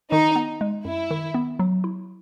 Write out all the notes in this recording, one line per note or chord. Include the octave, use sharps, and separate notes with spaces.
D#3 D#4
B3
G#3
F#2 E4
D#3
B3
F#3
E4